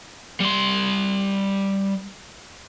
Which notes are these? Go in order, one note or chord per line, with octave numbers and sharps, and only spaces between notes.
G3 C6